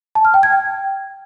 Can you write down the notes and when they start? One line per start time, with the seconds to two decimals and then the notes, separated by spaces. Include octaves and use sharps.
0.15 A5
0.25 F6
0.34 G5
0.43 G#6
0.52 G5